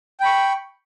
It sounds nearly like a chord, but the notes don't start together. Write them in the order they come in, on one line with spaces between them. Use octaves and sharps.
G5 B5 C#6